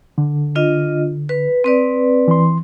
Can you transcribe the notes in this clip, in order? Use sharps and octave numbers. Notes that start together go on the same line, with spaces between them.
D3
D4 F4 D#5
B4
C4 B4 D5
E3 C6